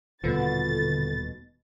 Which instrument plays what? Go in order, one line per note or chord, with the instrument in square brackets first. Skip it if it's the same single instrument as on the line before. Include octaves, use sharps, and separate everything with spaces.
[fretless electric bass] D#1 B2 [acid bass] D3 [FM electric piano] F4 A4 B4 [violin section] A6